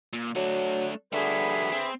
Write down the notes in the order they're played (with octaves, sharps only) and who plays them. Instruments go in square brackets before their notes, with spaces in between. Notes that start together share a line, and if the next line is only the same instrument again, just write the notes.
[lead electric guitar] A#2
[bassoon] F#3 [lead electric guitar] A3 D4
[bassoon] D3 [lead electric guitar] G3 F#4 [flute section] G#4 B4 E5
[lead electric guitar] C4